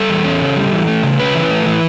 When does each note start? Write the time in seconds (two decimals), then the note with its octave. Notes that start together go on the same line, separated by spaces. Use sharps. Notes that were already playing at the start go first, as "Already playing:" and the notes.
Already playing: G3 A4
0.09 E2
0.25 C#4
0.41 C#3
0.56 G3
0.72 E3
0.87 A3
1.03 C#3
1.19 C#4 B4
1.35 E3
1.51 A3
1.66 E3